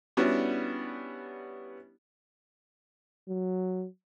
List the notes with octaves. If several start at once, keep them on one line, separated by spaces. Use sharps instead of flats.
G3 B3 C#4 D4 E4 F#4
F#3